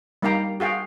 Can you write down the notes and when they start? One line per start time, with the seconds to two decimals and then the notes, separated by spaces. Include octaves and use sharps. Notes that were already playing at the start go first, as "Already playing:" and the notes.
0.22 G3 A#3 D#4 F5 G5 A#5
0.60 F#4 G#4 F5 G5